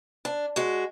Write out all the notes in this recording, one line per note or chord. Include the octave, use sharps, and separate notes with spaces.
D4
G#3 F#4